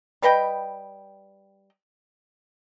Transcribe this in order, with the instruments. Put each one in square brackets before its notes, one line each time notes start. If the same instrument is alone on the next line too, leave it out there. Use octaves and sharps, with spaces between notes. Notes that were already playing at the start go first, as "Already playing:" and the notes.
[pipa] G3 B4 D#5 G5